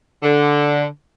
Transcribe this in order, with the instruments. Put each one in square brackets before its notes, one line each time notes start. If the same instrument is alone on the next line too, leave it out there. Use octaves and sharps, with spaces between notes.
[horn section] D3